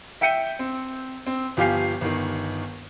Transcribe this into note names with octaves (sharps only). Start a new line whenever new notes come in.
E5 G5 G6 C#7 D#7
C4
C4
G1 F3 G4 F5 G#5 C7
G1 D#3